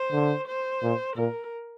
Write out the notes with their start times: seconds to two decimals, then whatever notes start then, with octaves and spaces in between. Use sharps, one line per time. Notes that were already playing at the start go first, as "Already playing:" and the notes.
Already playing: C5
0.12 D3
0.47 C5
0.82 A#2
1.16 A#2 A#4